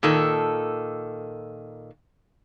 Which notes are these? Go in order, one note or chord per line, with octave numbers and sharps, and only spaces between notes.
A#2 D#3 A4